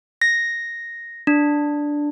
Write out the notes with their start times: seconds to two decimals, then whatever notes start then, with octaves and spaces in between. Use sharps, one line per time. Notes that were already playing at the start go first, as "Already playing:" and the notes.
0.22 A#6
1.27 D4